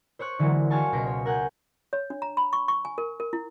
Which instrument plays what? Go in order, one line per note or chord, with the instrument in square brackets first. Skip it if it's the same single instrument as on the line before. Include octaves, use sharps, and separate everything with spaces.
[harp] C5 C#5 C#6 F#6
D3 E3 F#3 G#3 A#3
F#4 C5 F5 G#5 A5 C#6
C#2 B2 C6 A#6 C7 D7
C#5
A#4 F#5 G#5 F#6 G6
[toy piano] C#5
D4
A#5
B5
C#6
C#6
G#5
A#4
A#4
E4